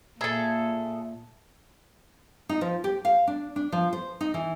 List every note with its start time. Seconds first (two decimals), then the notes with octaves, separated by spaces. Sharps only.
0.21 A#2 G#4 A4 E5
2.49 D#4
2.61 F3
2.84 G4
3.05 F5
3.28 D4
3.56 D4
3.72 F3
3.93 C5
4.21 D#4
4.34 E3